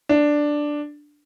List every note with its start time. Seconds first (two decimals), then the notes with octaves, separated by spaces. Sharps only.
0.09 D4